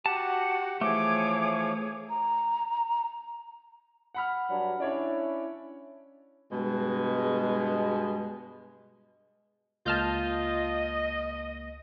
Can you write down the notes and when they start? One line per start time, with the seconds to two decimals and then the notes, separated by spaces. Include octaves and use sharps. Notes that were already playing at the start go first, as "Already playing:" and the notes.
0.06 F#4 G4 F#5 A5
0.81 E3 F3 A3 G#4 C#5 D6
2.09 A#5
4.14 F#5 B5 F6
4.49 G2 F#3 D4
4.80 C#4 D4 E4 C#5 D5
6.51 G2 B2 G#3
9.86 C#2 A#3 F4 D#5 A5 F6 G6